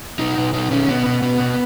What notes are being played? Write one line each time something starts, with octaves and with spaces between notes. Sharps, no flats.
B2 D#4
B2
B2 D#4
B2 C#4
B2 B3
B2
B2 B3
B2